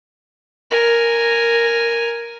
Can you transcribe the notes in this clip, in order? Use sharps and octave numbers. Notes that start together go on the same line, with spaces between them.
A#4 G#5